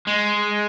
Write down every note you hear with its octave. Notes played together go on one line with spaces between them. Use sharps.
G#3